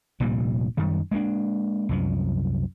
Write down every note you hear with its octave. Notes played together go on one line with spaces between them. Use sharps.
F1 D2 A#2 G3
F#2 D#3 G3
G#3 A#3 B3 D4
C2 F#2 F3